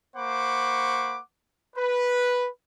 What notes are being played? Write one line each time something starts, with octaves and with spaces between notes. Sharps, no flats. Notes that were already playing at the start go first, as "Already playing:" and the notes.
A#3 C5 F#5 B5 C#6 D6
B4